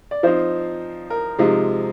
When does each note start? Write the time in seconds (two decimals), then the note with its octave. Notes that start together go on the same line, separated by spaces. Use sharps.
0.11 D5
0.23 F3 C4 D#4 C5
1.10 A#4
1.39 C3 F3 G#3 D#4